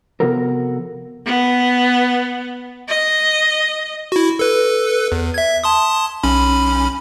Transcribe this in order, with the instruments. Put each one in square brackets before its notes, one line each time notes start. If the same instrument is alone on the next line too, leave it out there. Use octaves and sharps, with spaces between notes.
[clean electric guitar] C3 F3 B3 F#4 A4 A#4
[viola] B3
D#5
[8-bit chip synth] E4 F#4
A4 B4
E2
E5 G#6
A5 C6 D#6
B1 C#4 B5